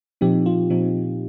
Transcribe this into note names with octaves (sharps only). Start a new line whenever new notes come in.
A#2 F3 C4 D#4 G4
F4
A#2 F3 C4 D#4